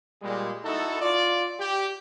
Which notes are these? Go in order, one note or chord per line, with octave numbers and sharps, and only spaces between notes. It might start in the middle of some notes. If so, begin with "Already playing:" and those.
A#2 G3 G#3
D#4 E4 F#4 A4
F4 D5
G4